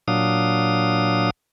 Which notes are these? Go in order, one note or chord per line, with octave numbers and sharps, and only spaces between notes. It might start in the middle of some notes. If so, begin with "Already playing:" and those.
A#2 F#3 D4 F5 D#6